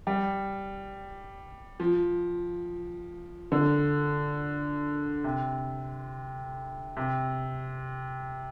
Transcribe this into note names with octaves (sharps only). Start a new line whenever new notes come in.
G3
F3
D3
C3
C3